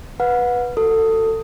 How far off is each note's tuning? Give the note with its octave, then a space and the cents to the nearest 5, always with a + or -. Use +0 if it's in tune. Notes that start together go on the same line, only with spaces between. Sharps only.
B4 -10 F#5 -30
F#4 +0 A4 +25